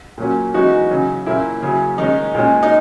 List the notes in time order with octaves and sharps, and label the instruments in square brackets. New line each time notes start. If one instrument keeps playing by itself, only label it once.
[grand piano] A#2 F#3 A#3 C#4
E3 G#3 C#4 D#4 F#4
C#3 F#3 C#4
A#2 A#3 C#4 E4
C#3 F#3 C#4
D#3 G#3 C#4 D#4
A#2 G#3 C#4
D#4